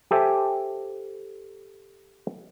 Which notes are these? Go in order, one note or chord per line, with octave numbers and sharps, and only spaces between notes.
G4 A4 C5 E5 G5 G#5